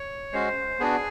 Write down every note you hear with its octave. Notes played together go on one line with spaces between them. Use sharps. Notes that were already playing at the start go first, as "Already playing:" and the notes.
Already playing: C#5
G#3 C#4 F#4 C5
B3 D4 F#4 G#4